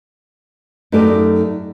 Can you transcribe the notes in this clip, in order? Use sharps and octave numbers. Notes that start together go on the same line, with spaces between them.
F#2 A3 D#4 F#4 G4 D5